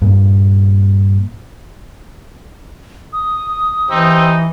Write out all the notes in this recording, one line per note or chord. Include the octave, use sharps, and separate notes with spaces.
G2 A#2
D#6
E3 D#4 G4 C5 E6